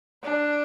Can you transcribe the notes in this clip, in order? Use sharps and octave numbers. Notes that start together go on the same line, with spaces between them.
D4